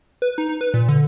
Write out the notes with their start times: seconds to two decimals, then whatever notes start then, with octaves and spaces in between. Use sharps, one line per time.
0.22 B4
0.38 D#4
0.49 D#4
0.61 B4
0.74 A#2
0.89 D3